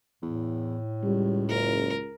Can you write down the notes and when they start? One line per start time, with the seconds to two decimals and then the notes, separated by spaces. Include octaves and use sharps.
0.22 E2 A2
1.03 C#2 G3
1.49 F#1 A#4